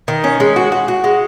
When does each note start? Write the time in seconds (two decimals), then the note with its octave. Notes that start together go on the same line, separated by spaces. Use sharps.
0.08 D#3
0.24 C#4
0.40 G#3
0.56 F#4
0.72 F#4
0.88 F#4
1.04 G#3